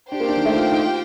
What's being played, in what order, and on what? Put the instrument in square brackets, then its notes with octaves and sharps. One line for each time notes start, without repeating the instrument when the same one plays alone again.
[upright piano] D4 [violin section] G4 C5 G5
[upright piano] A#3
D4
D#3
A3
F4
D#4
F4